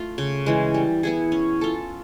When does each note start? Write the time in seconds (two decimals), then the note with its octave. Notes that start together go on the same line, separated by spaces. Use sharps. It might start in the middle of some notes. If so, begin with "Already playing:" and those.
Already playing: A3 F4
0.18 C#3
0.46 E3 G#3
0.74 G3
1.03 B3 E4 G#4
1.32 C#4
1.61 F4 A4